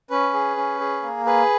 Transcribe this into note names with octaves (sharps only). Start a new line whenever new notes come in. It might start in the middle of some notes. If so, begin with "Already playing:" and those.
C#4 B4
G#4
C#4
G#4
A#3
G#4 B4